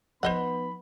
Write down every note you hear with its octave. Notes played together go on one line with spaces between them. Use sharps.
F3 B3 D#4 C5 D#5 F#5 B5